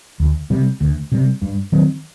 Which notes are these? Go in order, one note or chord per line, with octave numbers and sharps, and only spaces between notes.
D2
C3 G3
D2
C3 G3
G2
D#3 F#3 C4